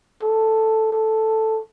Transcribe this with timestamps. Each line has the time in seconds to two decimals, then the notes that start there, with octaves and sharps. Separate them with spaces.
0.22 A4
0.92 A4